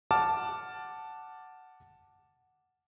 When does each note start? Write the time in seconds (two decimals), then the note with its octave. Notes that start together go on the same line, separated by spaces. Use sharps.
0.11 F#5 A5 D6 F6